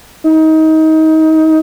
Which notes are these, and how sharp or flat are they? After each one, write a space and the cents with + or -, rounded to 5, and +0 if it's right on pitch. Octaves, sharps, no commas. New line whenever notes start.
D#4 +25